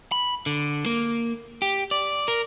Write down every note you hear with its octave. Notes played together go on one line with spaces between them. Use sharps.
B5
D3
A#3
G4
D5
A#4